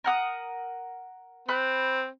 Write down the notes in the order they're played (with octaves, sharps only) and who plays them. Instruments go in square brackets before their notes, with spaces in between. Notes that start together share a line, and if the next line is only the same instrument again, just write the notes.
[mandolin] A#4 F#5 D#6
[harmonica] C4 [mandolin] B5 F#6